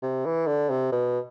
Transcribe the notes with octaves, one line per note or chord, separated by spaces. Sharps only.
C3
E3
D3
C3
B2